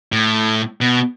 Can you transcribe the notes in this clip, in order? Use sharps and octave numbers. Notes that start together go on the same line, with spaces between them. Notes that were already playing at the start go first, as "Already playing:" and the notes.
A2
B2